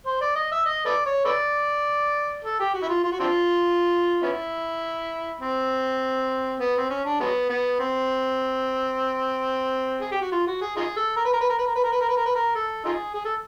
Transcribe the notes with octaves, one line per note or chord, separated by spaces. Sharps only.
C5
D5
D#5
E5
D#5
A4 B4 D5
C#5
A4 B4 D5
A4
G4
F#4
E4
F4
F4
F#4
C4 D4 F4
B3 C#4 E4
C4
B3
C4
C#4
D4
F#3 G#3 B3
B3
C4
G#4
G4
F#4
F4
F#4
G#4
D#4 F4 G#4
A4
A#4
B4
A#4
B4
A#4
B4
A#4
B4
A#4
B4
A#4
B4
A#4
B4
A#4
A4
D#4 F4 G#4
G#4
A4